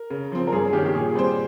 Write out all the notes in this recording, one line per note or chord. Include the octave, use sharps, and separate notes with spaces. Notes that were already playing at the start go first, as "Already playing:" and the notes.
Already playing: A#4
C#3
F3 C4
A#4
G2 G#4
G#4
D#3 A#3 C#4 G4
G4
A#2 G#4
G3 C4 G4 C5